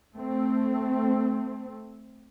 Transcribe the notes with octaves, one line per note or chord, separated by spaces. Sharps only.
A3 C4